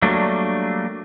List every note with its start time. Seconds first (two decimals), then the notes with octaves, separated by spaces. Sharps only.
0.02 F#3 G3 A3 A#3 D4